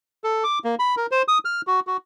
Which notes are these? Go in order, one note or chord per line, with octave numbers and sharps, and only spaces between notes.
A4
D6
A#3
B5
A#4
C5
D#6
F6
F#4
F#4